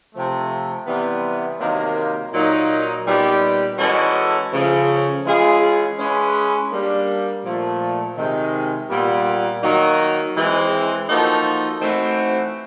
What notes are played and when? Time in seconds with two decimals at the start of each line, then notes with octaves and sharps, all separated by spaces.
0.14 C3 F3 A3
0.86 C3 E3 G3 B3
1.60 C3 D#3 F#3 A#3
2.33 A#2 F#3 A#3 D#4
3.05 A#2 G3 B3 D#4 G4
3.78 E3 G#3 C#4 F#4 A4
4.52 C#3 F3 A3
5.24 E3 G#3 C#4 F4 G#4
5.98 G#3 C#4 E4 G#4 B4
6.71 G3 A#3 D4
7.44 A#2 F3 A3
8.17 C3 D#3 G#3
8.89 A#2 G3 B3
9.62 D#3 F#3 A#3 D#4 F#4
10.36 E3 G#3 C4
11.08 F3 A#3 D#4 F#4 A4
11.81 E3 A3 C4 D#4 F#4